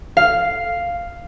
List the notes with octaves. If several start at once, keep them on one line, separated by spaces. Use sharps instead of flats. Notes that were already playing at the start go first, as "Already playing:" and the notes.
F5